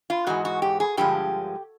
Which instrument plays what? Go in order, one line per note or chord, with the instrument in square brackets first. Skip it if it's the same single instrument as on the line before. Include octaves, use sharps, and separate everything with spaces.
[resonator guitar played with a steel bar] F4
G#2 E3 G#3 F#4
F#4
G4
G#4
G2 D3 F3 G#3 G4